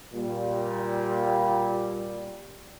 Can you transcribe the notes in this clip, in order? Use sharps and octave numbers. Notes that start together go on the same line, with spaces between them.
A#2 G3